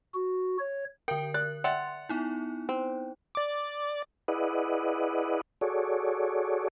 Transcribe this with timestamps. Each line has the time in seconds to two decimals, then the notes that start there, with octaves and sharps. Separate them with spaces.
0.14 F#4
0.59 C#5
1.08 D3 A#4 G5
1.34 D5 F#6
1.64 D5 E5 F#5 G5 C6 A6
2.09 B3 D#4 E4
2.69 C4
3.35 D5 D6
4.28 E4 G#4 B4 D5 D#5 F#5
5.61 F#4 G#4 A4 C#5 D5